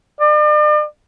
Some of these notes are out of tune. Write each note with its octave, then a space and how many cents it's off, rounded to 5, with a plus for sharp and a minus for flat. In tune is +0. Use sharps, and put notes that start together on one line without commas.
D5 +45